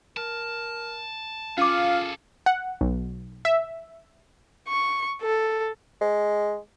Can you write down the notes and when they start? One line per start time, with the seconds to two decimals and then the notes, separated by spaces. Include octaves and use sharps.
0.17 A#4 A5
1.58 C#4 F4 G#4 A4 F5 D6
2.46 F#5
2.81 B1
3.45 E5
4.68 C#6
5.22 A4
6.01 G#3